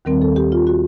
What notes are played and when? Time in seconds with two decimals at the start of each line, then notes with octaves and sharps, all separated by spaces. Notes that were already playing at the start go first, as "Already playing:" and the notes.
0.05 D#2 D#3 G3 C4 A#4
0.21 A4
0.36 G4
0.52 F4
0.67 F#4